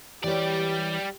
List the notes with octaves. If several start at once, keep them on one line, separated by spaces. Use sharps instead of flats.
E3 G3 G4 C#5 D5